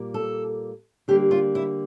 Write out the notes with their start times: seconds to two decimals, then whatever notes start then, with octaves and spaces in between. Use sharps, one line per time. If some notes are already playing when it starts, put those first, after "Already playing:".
Already playing: A#2 G3 A#3
0.14 A4
1.08 D3 G3 A#3 G4
1.31 F4
1.55 E4